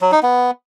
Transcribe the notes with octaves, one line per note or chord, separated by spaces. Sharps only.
F#3
D#4
B3